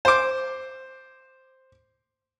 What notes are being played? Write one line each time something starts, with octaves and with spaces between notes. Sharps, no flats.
C5 D6